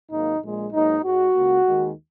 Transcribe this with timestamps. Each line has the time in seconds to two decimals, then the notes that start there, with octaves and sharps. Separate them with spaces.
0.10 G#1 G#2 F#3 A#3 D#4
0.41 A#1 A#2 G#3
0.73 G#2 F#3 A#3 D#4
1.03 G#2 G#3 F#4
1.34 C#2 C#3 A#3
1.66 D#2 D#3 G#3